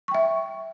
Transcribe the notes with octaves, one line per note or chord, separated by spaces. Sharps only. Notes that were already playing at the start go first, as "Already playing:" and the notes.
E5 G5 C#6